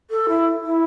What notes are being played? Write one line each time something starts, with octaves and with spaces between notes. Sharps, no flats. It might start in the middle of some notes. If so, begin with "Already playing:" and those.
A4
E4
E4